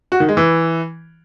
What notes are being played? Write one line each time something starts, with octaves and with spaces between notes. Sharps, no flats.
F#4
D#3
G#3
E3